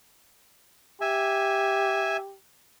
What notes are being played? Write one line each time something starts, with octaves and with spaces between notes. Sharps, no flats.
G4 E5 G#5